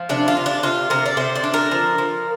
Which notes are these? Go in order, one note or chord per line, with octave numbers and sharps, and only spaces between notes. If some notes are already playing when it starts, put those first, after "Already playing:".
Already playing: F3
C3 D4
F4
C3
D4
C3 F4
C3 A#4
D5
C3 C5
D5
D4
A#4
F3
F3